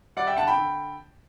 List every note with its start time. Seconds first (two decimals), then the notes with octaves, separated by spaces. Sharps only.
0.16 G3 D5 F#5
0.27 E5 G5
0.37 D3 F#5 A5
0.47 G5 B5
0.57 D3